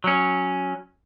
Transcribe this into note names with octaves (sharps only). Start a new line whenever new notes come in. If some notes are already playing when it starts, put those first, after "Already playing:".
F#3 C#4